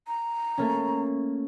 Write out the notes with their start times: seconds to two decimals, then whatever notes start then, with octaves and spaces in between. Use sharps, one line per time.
0.08 A#5
0.58 A3 A#3 C#4